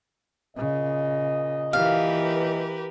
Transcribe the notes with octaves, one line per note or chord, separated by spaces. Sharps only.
A#2 C#3 D#5
E3 G4 A#4 B4 F5